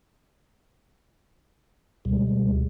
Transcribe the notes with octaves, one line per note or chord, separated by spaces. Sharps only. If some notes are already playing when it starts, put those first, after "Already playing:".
D2 B2 G3 G#3